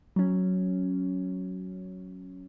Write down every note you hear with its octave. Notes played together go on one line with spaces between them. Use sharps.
F#3 C#4